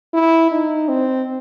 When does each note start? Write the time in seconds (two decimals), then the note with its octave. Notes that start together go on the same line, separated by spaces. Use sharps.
0.14 E4
0.51 D#4
0.89 C4